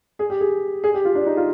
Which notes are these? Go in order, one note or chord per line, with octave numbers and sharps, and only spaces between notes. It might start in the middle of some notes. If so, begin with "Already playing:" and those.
G#4
G4
G#4
G#4
G4
F4
D4
D#4
F4